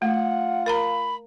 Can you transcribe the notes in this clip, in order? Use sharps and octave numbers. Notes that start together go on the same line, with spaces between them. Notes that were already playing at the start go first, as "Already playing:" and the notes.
A3 F4 F#5
A#4 F5 A#5 B5